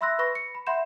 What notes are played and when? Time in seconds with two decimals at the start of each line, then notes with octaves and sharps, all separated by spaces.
0.01 E5 B5 C6 E6 F#6 A#6
0.19 B4 B5 C#6 A#6
0.35 C#7
0.55 B5
0.67 E5 F#5 B5 C6 G6 E7